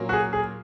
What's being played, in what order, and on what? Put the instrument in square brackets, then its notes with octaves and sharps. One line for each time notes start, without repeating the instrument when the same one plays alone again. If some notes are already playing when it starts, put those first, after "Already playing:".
Already playing: [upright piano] A#2 F#3 A#3 C#4
[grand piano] F#4
G#4
G#4